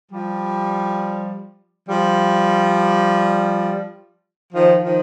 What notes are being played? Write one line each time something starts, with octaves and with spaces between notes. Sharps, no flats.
F3 G3
F3 G3
D#3 F3
D#3 F3